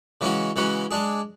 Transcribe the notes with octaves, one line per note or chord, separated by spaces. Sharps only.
C#3 E3 G#3 C#4 F#4
C#3 E3 G#3 C#4 F#4
G#3 D4 G#4